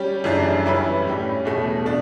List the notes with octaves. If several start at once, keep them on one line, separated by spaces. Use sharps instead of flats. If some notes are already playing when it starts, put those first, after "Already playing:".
Already playing: G3 C#4 G4
F#2 C#3 E3 A3 D4
E3 G3 C#4 E4 B4
A2 G3 C#4
E2 B2 A3
B2 A3 D4